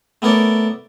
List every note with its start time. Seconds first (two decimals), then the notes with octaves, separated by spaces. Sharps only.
0.22 A3 B3 A#4 C#5 D5